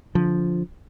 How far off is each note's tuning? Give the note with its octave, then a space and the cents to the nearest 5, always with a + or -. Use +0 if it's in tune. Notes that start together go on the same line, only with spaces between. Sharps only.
D3 -20 F3 +0